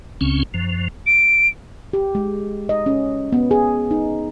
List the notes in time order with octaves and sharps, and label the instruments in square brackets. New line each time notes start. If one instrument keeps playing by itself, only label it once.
[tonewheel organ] C#2 C#3 C4 C#4
F#2 F3
[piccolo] D7
[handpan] G4
G#3
D#5
C#4
B3
G#4
D#4